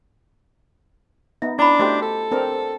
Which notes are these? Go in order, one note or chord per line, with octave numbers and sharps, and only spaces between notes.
B3 D#4 E5
C#4 D4 E4 B5
A3 F#4 G4 C5 D#5
A4
C4 D4 A#4